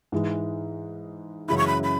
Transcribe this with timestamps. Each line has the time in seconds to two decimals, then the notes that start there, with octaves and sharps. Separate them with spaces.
0.12 G#2 E3 G#3
1.48 F#2 C#3 E3 G#3 E4 B5
1.58 C#6
1.67 B5
1.84 B5